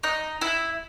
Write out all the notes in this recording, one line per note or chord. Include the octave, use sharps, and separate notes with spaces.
D#4
E4